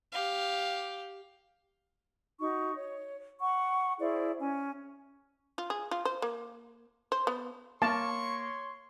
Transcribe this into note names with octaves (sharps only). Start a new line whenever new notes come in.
G4 F5
D#4 F#4 C#6
C#5
F#5 C#6
E4 G#4 C5 D5
C#4 G#5
F4
G#4
F4
C5
A#3
C5
B3
A#3 C#5 A5 C6 C#6